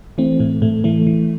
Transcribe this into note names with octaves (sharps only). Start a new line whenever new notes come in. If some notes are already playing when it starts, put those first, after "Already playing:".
E3 A3 C4
A2 A3
A2 A3
E3 A3
E3